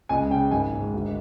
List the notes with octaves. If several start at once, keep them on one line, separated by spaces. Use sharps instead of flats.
C#2 G#5
C#3 G5
G#1 G#5
G#2
D2